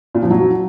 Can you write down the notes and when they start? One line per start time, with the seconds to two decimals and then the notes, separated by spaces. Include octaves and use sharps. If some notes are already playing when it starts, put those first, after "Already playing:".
0.15 A#2
0.22 F3
0.30 F#3